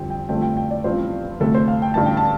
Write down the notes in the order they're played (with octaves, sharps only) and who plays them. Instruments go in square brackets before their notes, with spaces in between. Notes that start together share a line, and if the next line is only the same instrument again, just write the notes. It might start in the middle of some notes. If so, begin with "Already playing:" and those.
Already playing: [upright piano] F2 D3 G3 C4 G5
G5
G1 G2 F3 A3 C4 G5
G5
G5
D5
A1 G2 F3 C4 C5
D2 C3 A3 A4
C5
F5
G5
A1 G2 D3 A5
G5
A5